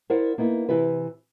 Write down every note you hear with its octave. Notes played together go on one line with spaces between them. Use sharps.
E4 A#4 C5 D5 F#5
A#3 B3 D#4 E4
C3 E3 E4 G4 B4